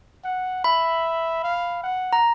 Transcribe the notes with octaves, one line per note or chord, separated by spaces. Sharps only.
F#5
E5 B5
F5
F#5
A#5